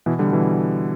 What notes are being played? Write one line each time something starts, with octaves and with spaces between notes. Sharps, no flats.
B2 E3
D3 G3
B2 E3